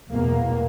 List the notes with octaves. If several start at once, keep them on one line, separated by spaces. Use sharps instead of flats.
E2 B2 A#3